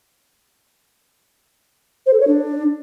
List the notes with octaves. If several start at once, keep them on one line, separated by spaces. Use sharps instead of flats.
C5
A4
C#5
D4